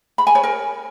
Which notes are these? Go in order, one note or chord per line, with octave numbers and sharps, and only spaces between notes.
B5
G#5
C#5
A#4